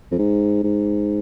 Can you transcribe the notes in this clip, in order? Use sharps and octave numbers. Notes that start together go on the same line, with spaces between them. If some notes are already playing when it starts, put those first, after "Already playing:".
F2
G#2
G#2